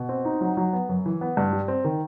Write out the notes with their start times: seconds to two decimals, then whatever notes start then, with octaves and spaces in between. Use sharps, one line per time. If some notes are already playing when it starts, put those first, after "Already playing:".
Already playing: B2
0.09 C4
0.25 D#4
0.41 F#3
0.57 F#3
0.73 B3
0.89 F#2
1.06 E3
1.21 B3
1.37 G2
1.52 G3
1.68 C4
1.84 D#3